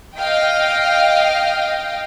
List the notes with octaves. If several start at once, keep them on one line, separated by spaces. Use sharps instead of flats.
D#5 F5 G5